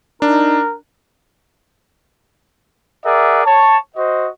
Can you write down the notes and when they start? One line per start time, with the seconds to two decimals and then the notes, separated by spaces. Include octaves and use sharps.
0.22 D4 D#4 A#4
3.04 G#4 A#4 D5 E5 F#5
3.45 C#5 A5
3.96 F#4 C5 D#5